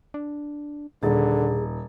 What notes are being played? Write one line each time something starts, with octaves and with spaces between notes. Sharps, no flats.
D4
D#1 A#2 D3 G#4 A6